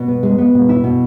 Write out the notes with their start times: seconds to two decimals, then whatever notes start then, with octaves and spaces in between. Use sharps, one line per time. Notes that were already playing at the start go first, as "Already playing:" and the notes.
Already playing: B2
0.08 B3
0.23 G#3
0.38 B3
0.55 B2
0.69 E4
0.84 B2